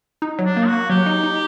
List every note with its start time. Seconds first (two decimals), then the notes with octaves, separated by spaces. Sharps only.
0.22 D#4
0.39 F#3
0.45 D4
0.56 A#3
0.67 F#4
0.73 A#3
0.90 F#3 G4
1.06 D#4
1.23 D#4